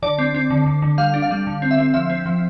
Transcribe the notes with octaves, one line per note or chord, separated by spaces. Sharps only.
D3 D5
C4
C4
D3
D3
D3
G3 F5
D4
F5
G3
D3
C4
E5
C4
F3 E5
C4
F3